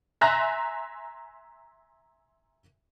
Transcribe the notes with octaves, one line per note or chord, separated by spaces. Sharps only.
E5 G#5 A#5 C6 F#6 A#6